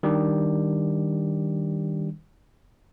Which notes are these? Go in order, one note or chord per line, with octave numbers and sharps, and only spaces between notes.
D#3 G3 D4 G4